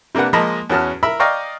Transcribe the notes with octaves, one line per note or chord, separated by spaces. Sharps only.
C3 A#3 D4 B4 F#5
F3 G#3 A#3 D#5 A5 B5
E2 C#4 F#4 A5 F6
A#4 E5 B5 E6
D5 D#5 F5 G5 A#5 C#6